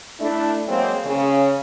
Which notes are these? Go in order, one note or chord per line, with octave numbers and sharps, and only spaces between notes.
A3 D4 E4
F#3 G#3 A#3 C4
C#3